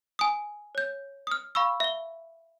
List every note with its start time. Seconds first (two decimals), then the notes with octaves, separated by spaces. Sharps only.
0.19 G#5 D#6
0.75 C#5 G6
1.27 D#6 F6
1.55 F5 B5 C#6 E6
1.80 E5 G7